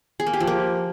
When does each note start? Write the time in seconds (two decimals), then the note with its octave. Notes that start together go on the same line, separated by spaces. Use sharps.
0.20 G#4
0.27 A#3
0.33 G4
0.40 F3
0.47 A#3